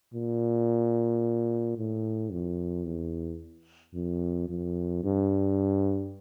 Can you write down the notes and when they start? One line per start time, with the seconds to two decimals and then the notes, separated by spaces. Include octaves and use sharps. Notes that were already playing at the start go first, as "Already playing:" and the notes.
0.14 A#2
1.77 A2
2.32 F2
2.85 E2
3.94 F2
4.48 F2
5.04 G2